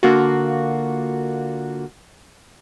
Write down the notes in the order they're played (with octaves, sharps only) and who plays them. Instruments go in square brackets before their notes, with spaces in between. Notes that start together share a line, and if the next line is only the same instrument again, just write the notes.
[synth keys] D3 A#3 F4 F#4